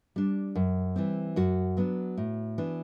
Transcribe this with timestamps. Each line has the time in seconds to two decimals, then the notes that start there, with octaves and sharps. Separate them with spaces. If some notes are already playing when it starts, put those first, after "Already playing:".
0.16 G3 D4
0.55 F#2
0.96 E3 G3 C4
1.36 F#2 F#4
1.77 F#3 B3 D4
2.18 A2
2.58 E3 B3 D4